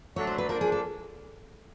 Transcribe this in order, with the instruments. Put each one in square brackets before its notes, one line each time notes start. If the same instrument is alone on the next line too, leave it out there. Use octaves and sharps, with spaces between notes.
[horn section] F#3 A3 D4 [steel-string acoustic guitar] C#5
[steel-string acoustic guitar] C5
B4
[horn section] F3 A#3 D4 [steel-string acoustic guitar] A#4
[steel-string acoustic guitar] G#4
A4